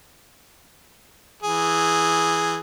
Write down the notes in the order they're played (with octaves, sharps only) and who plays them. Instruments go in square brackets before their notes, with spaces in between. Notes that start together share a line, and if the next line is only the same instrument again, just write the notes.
[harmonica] E3 G#4